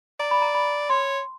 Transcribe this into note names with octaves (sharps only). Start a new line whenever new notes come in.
D5 A#5
B5
A#5
B5
C#5 C6